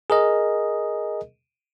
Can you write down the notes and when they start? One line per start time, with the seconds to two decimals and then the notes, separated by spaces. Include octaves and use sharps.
0.10 G#4 A#4 D#5